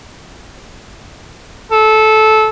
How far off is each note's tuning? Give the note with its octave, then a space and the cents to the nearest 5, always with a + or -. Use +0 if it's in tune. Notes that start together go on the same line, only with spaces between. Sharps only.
A4 -15